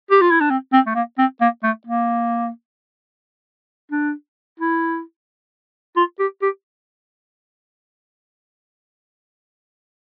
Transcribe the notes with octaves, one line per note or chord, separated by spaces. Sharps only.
G4
F4
E4
D4
C4
C4
A3
A#3
C4
A#3
A3
A#3
D4
E4
F4
G4
G4